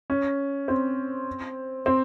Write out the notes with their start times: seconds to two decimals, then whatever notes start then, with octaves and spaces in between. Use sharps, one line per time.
0.10 C#4
0.68 C4
1.86 C4